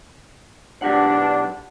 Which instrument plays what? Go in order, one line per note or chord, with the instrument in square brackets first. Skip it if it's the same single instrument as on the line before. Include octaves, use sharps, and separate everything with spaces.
[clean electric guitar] B1 G4 F#5 [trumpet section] D4